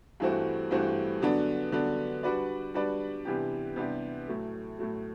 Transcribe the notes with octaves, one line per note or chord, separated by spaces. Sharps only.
G2 E3 A3 C4 F#4
G2 E3 A3 C4 F#4
D3 F#3 B3 D4
D3 F#3 B3 D4
G3 D4 F#4 B4 D5
G3 D4 F#4 B4 D5
C3 E3 B3 D4 G4
C3 E3 B3 D4 G4
A2 F#3 A3
A2 F#3 A3